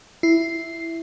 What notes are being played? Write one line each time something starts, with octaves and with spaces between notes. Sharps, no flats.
E4 C7